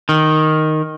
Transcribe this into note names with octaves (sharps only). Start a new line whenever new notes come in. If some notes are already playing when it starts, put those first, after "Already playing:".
D#3